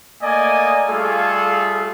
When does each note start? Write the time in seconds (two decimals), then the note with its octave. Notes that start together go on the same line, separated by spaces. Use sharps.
0.22 A3 A#3 D5 D#5 G#5
0.87 G3 A3 F4 G#4 A4 F5